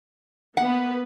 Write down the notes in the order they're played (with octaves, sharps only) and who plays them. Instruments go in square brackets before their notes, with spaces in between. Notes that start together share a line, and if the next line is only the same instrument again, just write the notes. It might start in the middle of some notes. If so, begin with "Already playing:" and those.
[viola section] A#3 B3 B4 [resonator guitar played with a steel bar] F#5